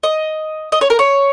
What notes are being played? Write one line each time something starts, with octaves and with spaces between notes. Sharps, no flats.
D#5
D#5
C#5
A#4
C#5